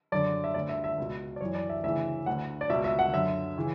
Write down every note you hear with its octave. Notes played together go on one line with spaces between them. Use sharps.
F#2 D3 D5
E5
D2 D3 D5
E5
E5
C#2 B2
D5
F#2 E3 C#5
D5
E5
D2 C#3 E3 E5
D2 D3 F#5
D5
C#2 B2 E5
E5
F#5
F#2 D3 E5
C#3 E3